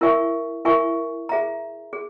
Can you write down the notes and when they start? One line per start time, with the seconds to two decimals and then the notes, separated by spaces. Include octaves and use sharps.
0.01 E4 A#4 E5 G#5 C#6
0.65 E4 A#4 E5 G#5 C#6
1.29 G#4 E5 A#5
1.93 G#4